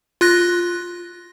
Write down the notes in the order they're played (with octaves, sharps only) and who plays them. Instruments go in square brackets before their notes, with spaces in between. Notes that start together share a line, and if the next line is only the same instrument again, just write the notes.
[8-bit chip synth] F4 F#6 A#6